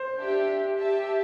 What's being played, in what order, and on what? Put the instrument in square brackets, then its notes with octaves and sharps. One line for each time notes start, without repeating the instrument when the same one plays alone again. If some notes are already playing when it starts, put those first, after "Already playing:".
Already playing: [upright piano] C5
[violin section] D4 G4 E5
G4 E5 A5